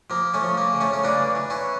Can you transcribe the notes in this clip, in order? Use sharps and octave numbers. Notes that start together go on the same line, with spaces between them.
F3 A#3
A3 C#4
F3
A#3
C#3
A3 C#4
C#4
E3 A#3 D4
E3
C#4 E4